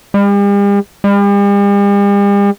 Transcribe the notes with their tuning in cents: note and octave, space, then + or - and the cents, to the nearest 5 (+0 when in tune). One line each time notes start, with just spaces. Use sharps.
G3 +45
G3 +45